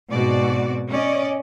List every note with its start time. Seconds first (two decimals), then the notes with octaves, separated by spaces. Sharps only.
0.12 G#2 B2 C4 F#4 D5
0.90 C#4 D5 D#5